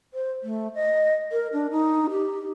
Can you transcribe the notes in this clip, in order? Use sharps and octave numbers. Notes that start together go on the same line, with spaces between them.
C5
A3
D#5
A#4
D4
D#4
G4